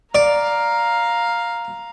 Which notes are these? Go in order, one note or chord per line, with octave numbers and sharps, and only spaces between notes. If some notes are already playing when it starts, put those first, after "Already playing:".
D5 F5 A#5